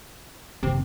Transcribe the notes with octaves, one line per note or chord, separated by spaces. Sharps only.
F#1 D#2 C3